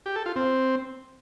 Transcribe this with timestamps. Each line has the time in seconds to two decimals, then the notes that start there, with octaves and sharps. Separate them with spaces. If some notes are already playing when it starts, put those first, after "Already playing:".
0.06 G4
0.16 A4
0.26 F4
0.36 C4